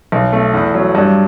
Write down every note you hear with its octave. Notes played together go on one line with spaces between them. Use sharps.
B1
A3
E2
F#3
G2